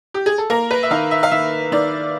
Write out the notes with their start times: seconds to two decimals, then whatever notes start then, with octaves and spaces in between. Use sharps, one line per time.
0.14 G4
0.26 G#4
0.38 A4
0.50 A#3 A#4
0.71 B4
0.83 E5
0.91 D#3 F5
1.11 E5
1.23 F5
1.31 D#3 E5
1.72 D#3 D5